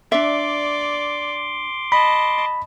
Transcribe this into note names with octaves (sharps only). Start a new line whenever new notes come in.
D4 D5 E5 C6 D6
D#5 A5 B5